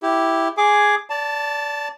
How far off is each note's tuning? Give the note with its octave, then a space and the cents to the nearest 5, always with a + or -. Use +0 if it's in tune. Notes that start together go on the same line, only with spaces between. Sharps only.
E4 +0 G4 +0
G#4 +0 G#5 +0 D6 +0
D5 -25 A5 +5